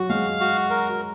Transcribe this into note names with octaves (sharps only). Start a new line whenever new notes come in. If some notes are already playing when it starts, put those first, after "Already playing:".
Already playing: F#3 F#4
G#3 F5
F#4
A#4